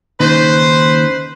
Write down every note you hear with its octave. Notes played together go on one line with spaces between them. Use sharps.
D#2 C#3 D#4 B4 C5